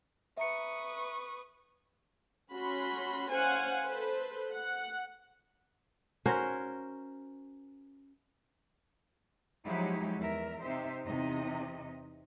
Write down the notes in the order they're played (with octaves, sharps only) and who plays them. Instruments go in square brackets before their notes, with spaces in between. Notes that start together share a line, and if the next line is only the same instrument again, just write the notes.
[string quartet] B4 C#6 D#6 [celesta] E5 A#5 C#7
[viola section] C#4 F#4 B5 C6
C#4 C5 F5 F#5 G#5
A4 B4 C5
F#5
[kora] C#4 F#4 A#4 C5
[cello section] F3 F#3 G#3 D#4 E4 G4
E2 A#4 E5
C3 D#4 G4 C5 E5
E2 C3 D#4 D#5